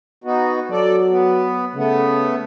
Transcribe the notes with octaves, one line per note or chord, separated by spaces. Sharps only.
B3 D#4 F#4
F#3 A4 D5
B3
C#3 A3 B3